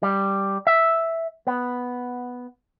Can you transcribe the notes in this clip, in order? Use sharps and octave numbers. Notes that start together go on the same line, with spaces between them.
G3
E5
B3